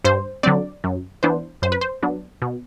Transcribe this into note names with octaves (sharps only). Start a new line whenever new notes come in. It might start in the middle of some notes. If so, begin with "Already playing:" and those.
G2 C5
D3 F#3 C4 D5
F#2
E3 B3 D4 C5
F#2 C5
B4
C5
F#3 B3 D4
B2